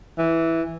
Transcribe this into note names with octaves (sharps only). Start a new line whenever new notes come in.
E3